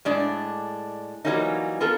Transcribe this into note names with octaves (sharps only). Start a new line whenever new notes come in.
A2 G#3 D4 D5
E3 F#3 G3 A#3 C#4 D#4
B3 F4 A4 A#4